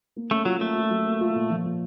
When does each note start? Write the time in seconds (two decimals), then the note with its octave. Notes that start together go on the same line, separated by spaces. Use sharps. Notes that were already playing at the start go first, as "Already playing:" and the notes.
0.16 A#3
0.31 A3 C#4
0.45 F#3 F4
0.61 A3 A#3
0.75 F4
0.90 F#3
1.05 A#3
1.21 F4
1.35 A#2
1.50 F3
1.65 A#2